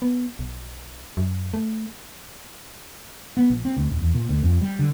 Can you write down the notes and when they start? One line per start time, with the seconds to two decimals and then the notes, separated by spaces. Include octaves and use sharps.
0.02 B3
0.39 B1
1.17 F#2
1.54 A3
3.37 B3
3.50 A#1
3.65 C4
3.77 D2
3.89 D#1
4.02 E2
4.14 A#2
4.29 D2
4.43 F2
4.61 G3
4.79 D3